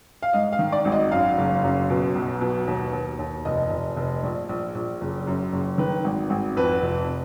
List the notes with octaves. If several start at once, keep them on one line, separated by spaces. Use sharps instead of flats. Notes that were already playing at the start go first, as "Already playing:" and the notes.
F5
G#2 D#5
F5
D#3
D5
G#1
D#5
F#2 F5
F#1
F#2
B2
B1
B2
D#2
D#2
D#2
F1 D#5
F1
F1
A#1
A#1
A#1
F#1
F#2
F#1
D#3 B4
G#1
G#1
F2 B4
F1